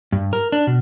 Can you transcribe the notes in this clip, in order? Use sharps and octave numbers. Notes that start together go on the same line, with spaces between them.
G2
A#4
D4
B2